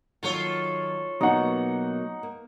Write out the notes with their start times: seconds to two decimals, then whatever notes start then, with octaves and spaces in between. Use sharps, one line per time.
0.23 D#3 F#3 A#3 F4 A4 C#5
1.21 B2 F#3 A#3 B3 D#4 F#5 C#6
2.23 A#3